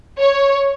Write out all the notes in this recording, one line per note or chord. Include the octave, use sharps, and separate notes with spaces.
C#5